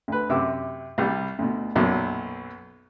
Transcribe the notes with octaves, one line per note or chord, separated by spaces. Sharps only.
D2 B4
F#2 C3 D6 E6
C2 G3
D2 B2
B1 F#2 A#2 F#3 B3